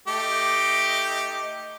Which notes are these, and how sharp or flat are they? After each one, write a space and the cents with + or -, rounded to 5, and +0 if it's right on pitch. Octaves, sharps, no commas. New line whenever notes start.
A3 +10 D#4 +0 G4 +0